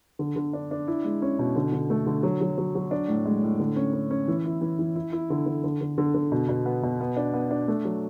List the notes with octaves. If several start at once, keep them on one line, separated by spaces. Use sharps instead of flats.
D3
D3
D4
D4
E4
G#3
C#4
B2
D3
D3
A3
D3
F#3
F#3
F#3
F#3
D4
A2
G#3
A2
D3
C#4
C#4
C#4
E3
E4
E3
E3
E4
E4
D3
D3
D3
D3
D3
D3
B2
B2
B3
B2
B3
D4
B3
D4
A3
F#3